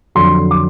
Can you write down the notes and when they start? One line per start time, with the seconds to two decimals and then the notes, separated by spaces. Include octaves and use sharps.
0.15 F2 D3 F#3 C6
0.51 D6